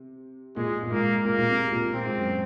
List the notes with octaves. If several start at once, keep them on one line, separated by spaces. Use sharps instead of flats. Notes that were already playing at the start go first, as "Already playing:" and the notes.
Already playing: C3
A#2 G#3
A#2
G#2 A#3
A#2 A#3
A#2
C3
A#2
A#2 C4
G#2
F#2